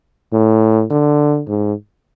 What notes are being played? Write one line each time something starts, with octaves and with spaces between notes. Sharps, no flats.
A2
D3
G#2